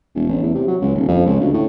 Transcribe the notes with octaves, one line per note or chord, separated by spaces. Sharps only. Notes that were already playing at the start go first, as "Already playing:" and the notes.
E1
A1
E2
C3
F#3
C#2
D#1
F2
C#2
D2
A2